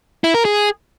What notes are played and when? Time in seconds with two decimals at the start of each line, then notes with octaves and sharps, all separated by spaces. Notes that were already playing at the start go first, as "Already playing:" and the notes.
0.24 E4
0.35 A#4
0.45 G#4